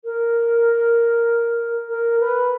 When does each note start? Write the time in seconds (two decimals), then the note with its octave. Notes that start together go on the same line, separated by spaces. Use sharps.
0.05 A#4
1.89 A#4
2.20 B4